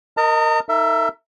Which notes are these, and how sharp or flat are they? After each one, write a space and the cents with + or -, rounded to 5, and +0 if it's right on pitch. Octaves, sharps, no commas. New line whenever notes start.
A#4 -5 D#5 +0 A#5 -45
D#4 +20 A#4 -45 E5 +15